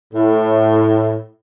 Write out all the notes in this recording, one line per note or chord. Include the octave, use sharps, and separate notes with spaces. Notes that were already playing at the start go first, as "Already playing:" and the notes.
A2